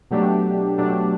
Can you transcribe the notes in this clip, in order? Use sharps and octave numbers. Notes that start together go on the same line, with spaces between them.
B2 F#3 A3 D4 G4
B2 F#3 A3 D4 G4